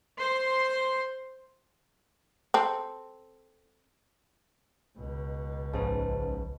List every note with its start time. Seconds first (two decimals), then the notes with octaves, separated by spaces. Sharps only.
0.18 C5 C6
2.54 C4 A4
4.98 C#2 B2
5.74 A#1 G#2 C#3 B4 C5 A5